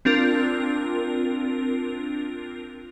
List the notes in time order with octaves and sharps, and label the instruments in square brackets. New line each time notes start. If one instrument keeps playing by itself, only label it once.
[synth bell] C4 D4 F4 A#4